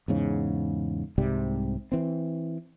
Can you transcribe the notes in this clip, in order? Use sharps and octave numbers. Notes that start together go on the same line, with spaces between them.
E2 G#2 C#3
C2 G#2 C3 G3
E3 C4